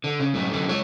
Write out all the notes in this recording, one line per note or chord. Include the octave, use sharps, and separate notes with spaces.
D3
C#3
F#2 A2
F#2 D3
G#3 C#5